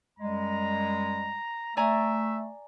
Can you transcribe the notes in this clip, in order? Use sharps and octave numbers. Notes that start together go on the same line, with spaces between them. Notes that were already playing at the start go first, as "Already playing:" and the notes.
F#2 G3 G#3 A#5
A3 D5 E5 G#5 A#5